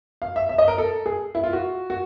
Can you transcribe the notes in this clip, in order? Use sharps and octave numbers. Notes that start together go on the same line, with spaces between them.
F5
E5
E5
D#5
A#4
A4
G#4
E4
F4
F#4
F#4